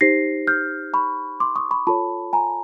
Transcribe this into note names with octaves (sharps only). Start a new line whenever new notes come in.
D#4 G4 C5 A#6 C7
F6 G6
B5 C#6
C6 D6
C#6 D#6
B5 C#6
F4 A4 C#5 A5 B5
G#5 A#5